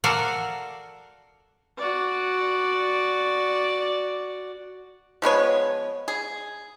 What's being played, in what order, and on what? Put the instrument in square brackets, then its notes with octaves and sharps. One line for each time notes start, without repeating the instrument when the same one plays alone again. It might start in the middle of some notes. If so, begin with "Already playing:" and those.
[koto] F#4 A4 A#4 D5 F5
[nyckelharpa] F#4 D5
[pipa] F3 G#3 B3 C#5
G#4